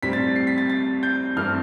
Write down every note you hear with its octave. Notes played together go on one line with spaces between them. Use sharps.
A2 G3 C4 B6
A6
C7
B6
A6
A6
G6
G2 E3 A3 C4 F6